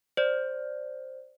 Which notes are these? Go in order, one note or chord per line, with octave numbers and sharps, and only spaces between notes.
C5 D5